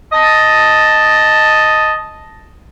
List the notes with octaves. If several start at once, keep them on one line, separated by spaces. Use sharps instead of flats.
D#5 A5